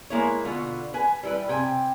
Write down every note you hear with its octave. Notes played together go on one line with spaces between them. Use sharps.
G#3 A#3 E4 C#5
B2 D3 B3 F4
B4 G#5
G3 E4 B4
C3 G5 G#5